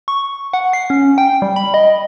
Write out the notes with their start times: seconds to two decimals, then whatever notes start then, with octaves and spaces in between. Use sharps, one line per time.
0.08 C#6
0.53 F#5
0.73 C7
0.90 C#4
1.18 G5
1.42 G3
1.56 B5
1.74 D#5